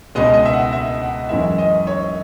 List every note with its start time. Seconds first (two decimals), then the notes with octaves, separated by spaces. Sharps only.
0.15 C#2 B2 G#3 D#5
0.33 D#5
0.45 E5
0.53 F#5
0.73 E5
1.01 F#5
1.29 F#2 E3 G#3 E5
1.58 D#5
1.87 C#5